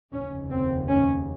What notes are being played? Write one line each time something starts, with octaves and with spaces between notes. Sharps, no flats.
F1 D#2 C#3 C#4
C4
C#4